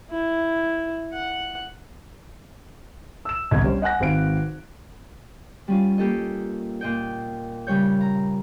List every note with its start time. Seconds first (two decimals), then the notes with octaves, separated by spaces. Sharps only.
0.10 E4
1.13 F#5
3.25 E6 E7
3.51 G1 C2 D#5 G#6
3.63 G3 C#4 C5
3.82 D#5 F#5 G#5 F#6 A#6
4.00 G#1 C4 B4 F5 D7
5.68 G3 C#4 F4
5.98 A#3 G4 A4 D#5
6.81 A#2 D#5 G5
7.67 G2 C#3 G3 C#5 G6
8.01 A#5